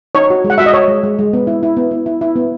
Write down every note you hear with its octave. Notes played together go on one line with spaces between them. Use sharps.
D#4 C#5
F#4
G#3
F#5
F#4 E5
D#5
F#4 C#5
G#3
G#3
G#3
B3
E4
E4
B3
E4
E4
E4
B3